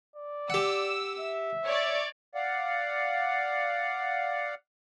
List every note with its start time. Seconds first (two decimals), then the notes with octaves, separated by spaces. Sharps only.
0.16 D5
0.50 G4 F#5 E6
1.20 E5
1.66 C#5 D5
2.35 D5 F5 F#5